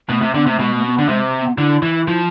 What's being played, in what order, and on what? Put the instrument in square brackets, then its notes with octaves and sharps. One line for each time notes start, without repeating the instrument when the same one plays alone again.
[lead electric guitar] B2 [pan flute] A3
[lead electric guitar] C3
[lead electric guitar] D3 [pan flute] B3
[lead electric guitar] C3
[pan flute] A3
[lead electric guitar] B2 [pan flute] G#3
[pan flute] A3
C4
B3
[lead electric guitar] D3
[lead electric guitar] C3 [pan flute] G#3
[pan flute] B3
[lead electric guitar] D3 [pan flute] E4
[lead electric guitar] E3
[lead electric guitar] F3 [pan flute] E4